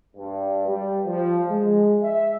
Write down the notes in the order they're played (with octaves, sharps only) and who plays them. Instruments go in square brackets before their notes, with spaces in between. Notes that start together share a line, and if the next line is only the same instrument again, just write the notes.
[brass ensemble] G2
G3
F3
G#3
E5